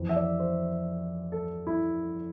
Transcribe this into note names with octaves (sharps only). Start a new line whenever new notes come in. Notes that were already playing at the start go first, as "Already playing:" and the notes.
Already playing: F2 E3
E5
D5
C5
A4
E4